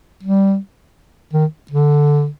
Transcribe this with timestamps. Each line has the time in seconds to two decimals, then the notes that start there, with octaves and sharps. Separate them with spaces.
0.23 G3
1.34 D#3
1.71 D3